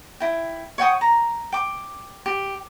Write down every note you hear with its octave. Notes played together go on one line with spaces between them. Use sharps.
E4 G5
C#5 F#5 G5 D#6
A#5
G5 D6
G4